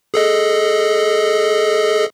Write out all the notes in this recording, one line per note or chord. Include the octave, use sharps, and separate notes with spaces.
G#4 A4 D#5